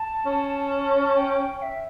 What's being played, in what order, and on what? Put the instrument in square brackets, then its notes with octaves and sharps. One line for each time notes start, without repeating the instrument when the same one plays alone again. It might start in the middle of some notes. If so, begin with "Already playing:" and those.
Already playing: [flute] A5
[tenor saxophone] C#4
[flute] G5
E5